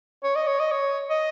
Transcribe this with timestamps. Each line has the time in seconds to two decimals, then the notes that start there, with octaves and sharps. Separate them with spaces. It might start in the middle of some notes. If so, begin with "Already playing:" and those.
0.24 C#5
0.36 D#5
0.47 C#5
0.60 D#5
0.71 C#5
1.10 D#5